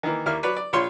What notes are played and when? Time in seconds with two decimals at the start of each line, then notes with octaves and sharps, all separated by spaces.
0.03 D#3 E3 A#3
0.26 D#2 A#3 E4 F6
0.43 F#3 B4 C#5 D5
0.57 D5
0.73 A#1 F4 C#5 C6